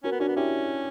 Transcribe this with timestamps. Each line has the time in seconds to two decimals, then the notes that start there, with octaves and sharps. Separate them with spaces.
0.04 C#4 F#4 A#4
0.12 B3
0.20 C#4 D4 F#4
0.28 B3
0.36 C#4 E4 G4